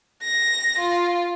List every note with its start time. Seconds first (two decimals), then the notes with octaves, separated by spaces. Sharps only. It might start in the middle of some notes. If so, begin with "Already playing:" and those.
0.24 A#6
0.79 F4